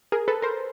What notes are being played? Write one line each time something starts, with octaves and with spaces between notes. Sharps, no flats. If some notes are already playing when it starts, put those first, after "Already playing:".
G#4 A#4
A4 B4
A#4 C5